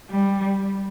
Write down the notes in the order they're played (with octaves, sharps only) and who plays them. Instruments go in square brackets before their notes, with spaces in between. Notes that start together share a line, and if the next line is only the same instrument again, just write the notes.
[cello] G3